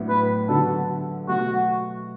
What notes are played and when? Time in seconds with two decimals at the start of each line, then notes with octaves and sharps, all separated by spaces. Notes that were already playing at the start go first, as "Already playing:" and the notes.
Already playing: A2 F#3 B3 D4
0.09 B4
0.49 D3 F#3 B3 F#4 A4
1.28 B2 F#3 A3 F#4